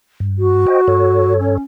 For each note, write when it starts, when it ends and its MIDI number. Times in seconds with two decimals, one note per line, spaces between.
0.20 0.66 43
0.38 1.33 66
0.67 0.81 72
0.67 0.81 75
0.67 0.81 79
0.88 1.58 43
0.88 1.58 69
0.88 1.58 73
1.39 1.62 61